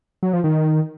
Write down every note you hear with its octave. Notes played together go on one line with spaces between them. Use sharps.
F#3
F3
D#3